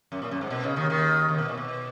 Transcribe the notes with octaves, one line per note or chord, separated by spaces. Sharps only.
F#2
A#2
F#2
G#2
B2
C#3
D#2 D#3
D#2 D#3
D#2 D#3
B2
A#2
B2